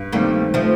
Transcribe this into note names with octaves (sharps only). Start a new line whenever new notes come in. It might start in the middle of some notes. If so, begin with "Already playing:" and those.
Already playing: G2
D#3 G3 A3 A#3 C4
F3 A3